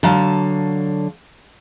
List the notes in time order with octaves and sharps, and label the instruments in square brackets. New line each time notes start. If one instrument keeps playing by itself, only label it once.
[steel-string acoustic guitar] D3 F#3 F5 A5